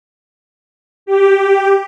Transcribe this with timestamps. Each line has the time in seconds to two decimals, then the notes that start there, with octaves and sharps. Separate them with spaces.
1.06 G4